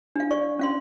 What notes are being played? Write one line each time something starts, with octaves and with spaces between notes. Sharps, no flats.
D4 F5
D5 C#6
C#4 F5 C6